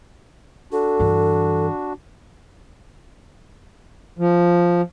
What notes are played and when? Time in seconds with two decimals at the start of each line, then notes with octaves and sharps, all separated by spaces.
0.72 D4 F#4 A4
1.00 G2 E3
4.18 F3